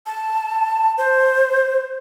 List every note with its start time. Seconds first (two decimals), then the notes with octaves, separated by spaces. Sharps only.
0.06 A5
0.98 C5